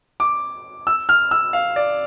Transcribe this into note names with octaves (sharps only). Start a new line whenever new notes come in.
D6
E6
F6
E6
F5
D5